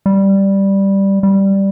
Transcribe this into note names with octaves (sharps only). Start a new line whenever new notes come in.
G3
G3